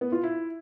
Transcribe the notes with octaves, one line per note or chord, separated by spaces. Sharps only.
B3
F4
E4